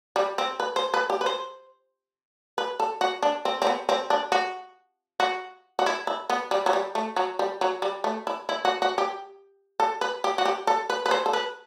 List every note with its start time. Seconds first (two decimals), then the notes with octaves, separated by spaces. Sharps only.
0.16 G3
0.38 C4
0.60 B4
0.76 C5
0.94 B4
1.10 G4
1.21 B4
1.26 C5
2.58 B4
2.80 A4
3.01 F#4
3.23 D4
3.45 C4
3.62 C4
3.67 B3
3.89 C4
4.10 D4
4.32 F#4
5.20 F#4
5.79 F#4
5.86 E4
6.07 E4
6.30 B3
6.51 G3
6.66 F#3
6.73 G3
6.95 A3
7.16 F#3
7.39 G3
7.61 F#3
7.82 G3
8.04 A3
8.27 E4
8.49 E4
8.65 F#4
8.82 F#4
8.98 G4
9.80 A4
10.01 B4
10.24 G4
10.38 F#4
10.45 G4
10.67 A4
10.90 B4
11.06 B4
11.11 C5
11.26 A4
11.33 B4